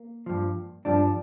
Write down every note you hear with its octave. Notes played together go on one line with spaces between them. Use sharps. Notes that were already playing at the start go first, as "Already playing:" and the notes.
Already playing: A#3
G2 F3
G2 F3 D4